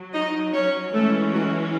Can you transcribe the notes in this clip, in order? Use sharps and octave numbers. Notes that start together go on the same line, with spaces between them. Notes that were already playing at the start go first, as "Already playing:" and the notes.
Already playing: F#3
D#4 D#5
C#4 C#5
E3 G#3 A3 C#4 A4
F#3 F#4